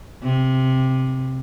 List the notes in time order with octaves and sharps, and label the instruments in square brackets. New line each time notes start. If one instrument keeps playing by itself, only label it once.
[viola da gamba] C3